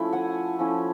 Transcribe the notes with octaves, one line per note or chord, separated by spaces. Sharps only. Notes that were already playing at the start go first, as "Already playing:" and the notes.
Already playing: F3 A3 C#4 E4
F#5 G#5
F3 A3 C#4 E4